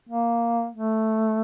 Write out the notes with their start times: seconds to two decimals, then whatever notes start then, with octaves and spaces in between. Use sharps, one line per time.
0.09 A#3
0.73 A3